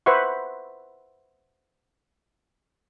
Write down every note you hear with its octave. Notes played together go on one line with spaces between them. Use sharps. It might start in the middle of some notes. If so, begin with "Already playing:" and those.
B4 C5 E5 F#5 C#6